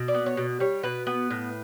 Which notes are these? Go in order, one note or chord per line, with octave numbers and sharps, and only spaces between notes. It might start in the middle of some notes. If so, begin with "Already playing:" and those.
Already playing: B2
D5
B3
C#5
B2
G3 C#5
B2 B4
B3 B4
A2